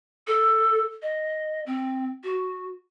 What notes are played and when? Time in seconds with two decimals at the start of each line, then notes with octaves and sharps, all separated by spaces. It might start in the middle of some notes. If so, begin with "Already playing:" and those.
0.27 A4
1.02 D#5
1.66 C4
2.23 F#4